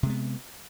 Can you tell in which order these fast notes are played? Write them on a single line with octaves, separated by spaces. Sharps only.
C3 G#3 B3